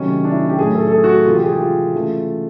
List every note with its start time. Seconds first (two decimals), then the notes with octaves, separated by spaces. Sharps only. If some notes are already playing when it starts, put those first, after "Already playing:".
Already playing: C3 D#3 F#3 A3 C#4
0.24 D4
0.32 E4
0.49 G4
0.58 A2 F#3 A3 G#4
0.75 A4
0.87 A4
0.92 G#4
1.04 F#4
1.26 C3 E3 G#3 F4
1.35 G4
1.43 G#4
1.52 G4
1.61 F4
1.94 C#3 E3 A3